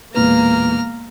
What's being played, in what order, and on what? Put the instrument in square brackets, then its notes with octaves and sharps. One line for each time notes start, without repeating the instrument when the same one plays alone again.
[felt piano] E1 A#2 B4 [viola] A#3 [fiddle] A#5 F6